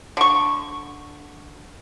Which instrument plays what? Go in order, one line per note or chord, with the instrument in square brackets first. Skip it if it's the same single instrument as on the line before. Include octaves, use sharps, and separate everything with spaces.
[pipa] D3 C#6